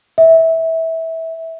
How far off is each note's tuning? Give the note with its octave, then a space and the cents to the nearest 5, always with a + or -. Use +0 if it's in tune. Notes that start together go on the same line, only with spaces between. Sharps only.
E5 -20